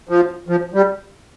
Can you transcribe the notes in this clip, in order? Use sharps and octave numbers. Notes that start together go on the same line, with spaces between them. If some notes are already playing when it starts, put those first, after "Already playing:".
F3
F3
G3